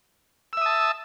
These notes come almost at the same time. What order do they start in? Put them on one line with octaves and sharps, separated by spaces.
E6 E5 D#6 A5